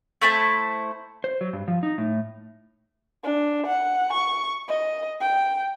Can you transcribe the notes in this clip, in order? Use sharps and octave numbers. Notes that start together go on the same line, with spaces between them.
A3 E4 C5 A5
C5
F#3
G2
F3
D#4
A2
D4
F#5
C#6
D#5
G5